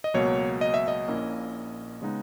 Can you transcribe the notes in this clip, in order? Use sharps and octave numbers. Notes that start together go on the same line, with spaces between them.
D#5
C#2 B2 F#3 A#3 C#5
D#5
E5
D#5
A#1 A#2 A#3 C#4 E4
C#3 G#3 B3 D#4